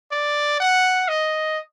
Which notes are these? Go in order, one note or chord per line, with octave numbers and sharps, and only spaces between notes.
D5
F#5
D#5